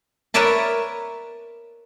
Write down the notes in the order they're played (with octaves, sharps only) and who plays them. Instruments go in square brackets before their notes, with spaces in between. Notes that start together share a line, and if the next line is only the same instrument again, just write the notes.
[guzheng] A#4 B4 C#5 D5 E5 A5